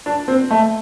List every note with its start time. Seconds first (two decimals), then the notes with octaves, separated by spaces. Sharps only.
0.06 D4
0.28 C4
0.51 A3